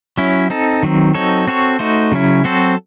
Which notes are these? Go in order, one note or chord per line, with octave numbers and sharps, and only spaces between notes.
F#3 C#4 E4
C4 D#4 A4
D#3 F#3 C4
F#3 C4 D#4 A4 C#5
C4 F#4 A4 C#5
A3 D#4 F#4 C5
C#3 F#3 C#4 E4
F#3 C4 F#4 A4 C5